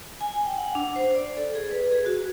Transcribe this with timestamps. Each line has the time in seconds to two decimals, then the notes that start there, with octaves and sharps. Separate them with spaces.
0.21 G#5
0.46 G5
0.58 F#5
0.75 D4
0.96 C5
1.15 D5
1.37 A4
1.55 G#4
1.71 B4
1.92 G#4
2.06 F#4